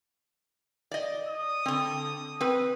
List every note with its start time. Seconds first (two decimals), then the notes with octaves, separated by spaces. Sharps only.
0.91 D5 D#5
1.28 D#6
1.66 D3 C4
2.41 C4 B4